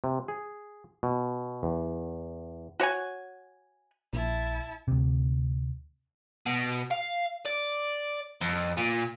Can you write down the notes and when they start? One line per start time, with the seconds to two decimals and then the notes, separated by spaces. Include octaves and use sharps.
0.04 C3
0.28 G#4
1.03 B2
1.63 E2
2.80 F#4 C#5 F#5 G#5
4.13 A#1 E4 A5
4.88 D2 C3
6.46 B2
6.91 F5
7.45 D5
8.41 F2
8.77 A#2